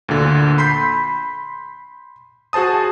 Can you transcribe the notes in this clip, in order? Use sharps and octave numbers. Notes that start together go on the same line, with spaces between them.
D2 A#2 D3
B5 C6 G6 B6 C7
F#4 G#4 C5 A5 D#6